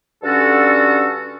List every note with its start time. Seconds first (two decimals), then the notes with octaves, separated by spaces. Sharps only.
0.23 G2 D3 C#4 F#4 A4